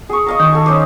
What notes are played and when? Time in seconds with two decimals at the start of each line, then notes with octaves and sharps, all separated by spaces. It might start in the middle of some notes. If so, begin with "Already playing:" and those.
0.09 G#4 C#6
0.26 D#5 F5 A#5
0.40 D#3 D#4 C#6
0.52 A4 G#5
0.66 C#4 D#4 C5 D6